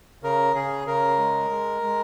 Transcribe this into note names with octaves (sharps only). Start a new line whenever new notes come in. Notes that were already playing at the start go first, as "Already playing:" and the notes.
C#3 A#4
C#3 G#4
C#3 A#4
G#3
G#3
G#3